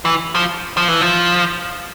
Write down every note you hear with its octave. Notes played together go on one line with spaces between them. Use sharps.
E3
F3
F3
E3
F3